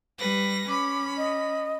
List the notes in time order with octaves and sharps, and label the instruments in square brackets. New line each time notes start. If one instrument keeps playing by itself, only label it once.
[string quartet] G3 B4 A#6
[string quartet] C#4 B5 [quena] D6
[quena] D#5